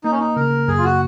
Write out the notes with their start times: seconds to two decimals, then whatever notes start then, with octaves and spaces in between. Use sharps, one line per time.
0.04 A#3 D#4
0.12 C#4
0.19 D#4
0.36 C#3 A#4
0.68 F#2 G#4
0.78 F4
0.84 F#4